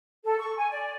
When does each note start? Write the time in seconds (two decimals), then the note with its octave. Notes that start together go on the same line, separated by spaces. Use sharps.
0.24 A4
0.38 C#6
0.57 G#5
0.70 D5